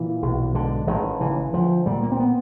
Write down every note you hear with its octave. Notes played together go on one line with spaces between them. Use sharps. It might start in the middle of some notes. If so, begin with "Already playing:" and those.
Already playing: A#2 E3
B1
G#2 D3
A1 D#3
C#3 E3
D2 F3
A#2 G3
A#3
C4
B3